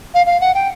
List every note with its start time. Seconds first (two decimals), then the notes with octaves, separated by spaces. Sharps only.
0.14 F5
0.27 F5
0.41 F#5
0.54 G5